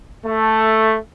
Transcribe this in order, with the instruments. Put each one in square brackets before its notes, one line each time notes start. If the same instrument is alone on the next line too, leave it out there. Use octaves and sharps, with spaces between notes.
[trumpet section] A3